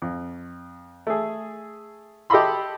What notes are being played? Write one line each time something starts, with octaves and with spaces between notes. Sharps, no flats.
F2
A3 G#4
G4 A4 D#5 E5 B5 C6